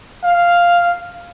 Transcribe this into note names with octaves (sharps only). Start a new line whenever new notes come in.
F5